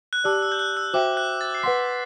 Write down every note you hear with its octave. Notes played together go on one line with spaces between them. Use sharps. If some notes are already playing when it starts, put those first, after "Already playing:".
F#6
G4 D5 A5 D6 E6
E6
G6
F#6
E6
F#4 C5 E5 G5 D6
F#6
A6
C7
B4 F#5 C6 B6